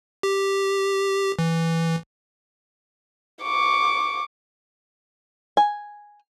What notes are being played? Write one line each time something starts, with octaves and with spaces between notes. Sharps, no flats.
G4
E3
C#6 D6
G#5